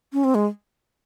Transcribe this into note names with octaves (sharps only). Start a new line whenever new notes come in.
C#4
C4
G#3